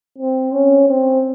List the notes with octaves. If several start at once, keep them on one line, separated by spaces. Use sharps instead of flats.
C4
C#4
C4